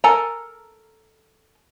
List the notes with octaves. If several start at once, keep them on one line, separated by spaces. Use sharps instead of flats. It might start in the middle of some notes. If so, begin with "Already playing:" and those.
A4 A#4 G#5 A#5